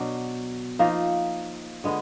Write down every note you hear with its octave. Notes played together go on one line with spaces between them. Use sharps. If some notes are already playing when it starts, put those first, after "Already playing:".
Already playing: B2 F#3 D4
F3 A#3 D#4
D3 G#3 B3